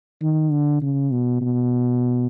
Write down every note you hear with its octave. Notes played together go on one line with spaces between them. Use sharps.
D#3
D3
C#3
B2
B2